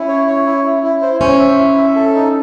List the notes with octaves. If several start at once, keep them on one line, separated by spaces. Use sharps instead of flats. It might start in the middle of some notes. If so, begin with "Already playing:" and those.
Already playing: C#4 E4
C#5
C#5
E4
E4
E4
C5
C#4 C5
E5
E4
E5
A4
D#4